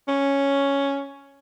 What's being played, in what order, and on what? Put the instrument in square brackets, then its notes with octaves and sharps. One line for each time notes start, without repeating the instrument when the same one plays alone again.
[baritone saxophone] C#4